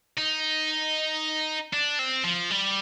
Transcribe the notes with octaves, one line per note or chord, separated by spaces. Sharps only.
D#4
D4
C4
F3
G3